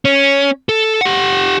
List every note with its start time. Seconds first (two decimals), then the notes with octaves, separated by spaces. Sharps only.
0.05 C#4
0.69 A4
1.01 G4 F#5